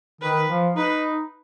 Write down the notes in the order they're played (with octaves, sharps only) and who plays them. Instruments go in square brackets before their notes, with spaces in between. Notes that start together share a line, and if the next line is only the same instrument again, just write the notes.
[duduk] D#3 [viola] B4
[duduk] F3
[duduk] D#4 [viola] B4